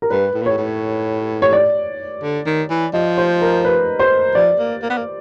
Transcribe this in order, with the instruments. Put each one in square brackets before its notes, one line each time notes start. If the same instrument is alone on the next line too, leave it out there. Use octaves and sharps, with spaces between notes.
[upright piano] A#4
[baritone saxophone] G2 [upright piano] B4
[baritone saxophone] A2
A#2
[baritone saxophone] A2 [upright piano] C#5
[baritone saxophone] A2
[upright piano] C#5
D5
[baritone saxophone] D3
D#3
E3
[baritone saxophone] F3 [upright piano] D#5
[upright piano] C5
A#4
B4
C5
[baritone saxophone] F3 [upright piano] D5
[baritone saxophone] A#3
A#3
B3
A#3